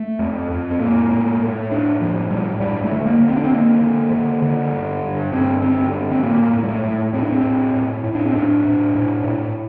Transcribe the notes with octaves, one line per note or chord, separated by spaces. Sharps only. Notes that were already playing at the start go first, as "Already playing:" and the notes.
Already playing: A3
F2
F2
C4
A2 A#3
A2
A2
A2 D4
A2 F3
A2 G3
G2 G3
A3
D3
A#3
D3
C4
D4
C4
D3 A#3
D3
D3
D3
G2
G2
G2 C4
D3 C4
G2
C4
A2 A#3
A2
G3
A3
A2
A2 C4
D4
C4
A2
A2
A2
D4
C4
A2 D4
A2
A2
A2